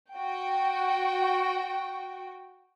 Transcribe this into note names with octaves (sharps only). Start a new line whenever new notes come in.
F#4 G5